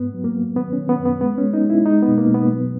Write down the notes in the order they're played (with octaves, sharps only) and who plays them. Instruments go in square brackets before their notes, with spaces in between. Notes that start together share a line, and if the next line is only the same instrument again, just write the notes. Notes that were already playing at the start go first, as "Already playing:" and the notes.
Already playing: [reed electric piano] G#2 B3
F#3
A#3
F#3
D#3 B3
C#4
D#3
B3
F#2
B3
G#3 B3
C#4
G#3
D#4
G#3 E4
G#3 D#4
B3
B2
A#3
B2
B3
F#3